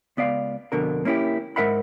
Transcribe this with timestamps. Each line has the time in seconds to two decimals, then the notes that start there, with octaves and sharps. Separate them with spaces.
0.17 C#2 B3 D5 F5
0.72 F2 B2 D3 A#4
1.05 A#3 C#4 E4 F4 G4
1.56 G#2 E3 A#4 E5 F#5 B5